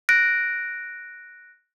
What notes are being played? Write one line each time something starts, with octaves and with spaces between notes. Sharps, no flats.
F#6 A#6 D7